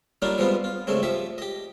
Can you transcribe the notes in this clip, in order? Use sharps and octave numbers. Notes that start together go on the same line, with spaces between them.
F#3 G3 A#3 D4 D#4 F4
F3 G3 G#3 B3 C4 F4
F4
G2 C#3 G#3 A3 C4
F3 G4 E5
G4 D#5